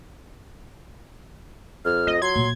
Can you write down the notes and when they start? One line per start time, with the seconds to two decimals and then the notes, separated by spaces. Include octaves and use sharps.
1.85 F2 F6
2.07 F4 D#5
2.22 F#3 C6 G#6
2.36 A#2